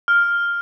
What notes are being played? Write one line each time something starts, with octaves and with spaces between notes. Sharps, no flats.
F6